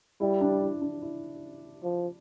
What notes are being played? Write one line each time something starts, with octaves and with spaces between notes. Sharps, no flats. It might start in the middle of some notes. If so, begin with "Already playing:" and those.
G3 E4
D4
E4
D4
E4
F3